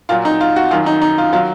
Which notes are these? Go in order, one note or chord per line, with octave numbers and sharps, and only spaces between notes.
A#2 F#3 F4
D#4
F4
F#4
F#2 D#3 F#3 F4
D#4
D#4
F4
D#3 F#3 F4